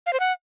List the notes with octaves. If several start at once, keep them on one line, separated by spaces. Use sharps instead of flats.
F5
C5
F#5